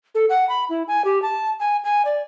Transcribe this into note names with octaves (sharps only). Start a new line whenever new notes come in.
A4
F#5
B5
E4
G#5
G4
A5
G#5
G#5
D5